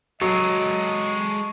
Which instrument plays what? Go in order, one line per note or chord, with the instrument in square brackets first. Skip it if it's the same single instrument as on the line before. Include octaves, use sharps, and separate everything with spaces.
[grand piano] F#3 [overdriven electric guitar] G#3 A4 [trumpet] D#5 [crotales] C#6